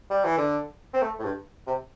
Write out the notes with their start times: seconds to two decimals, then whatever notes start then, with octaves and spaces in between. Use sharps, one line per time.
0.10 G3
0.24 E3
0.38 D3
0.93 C4
1.02 A3
1.19 A2
1.24 G2
1.67 C3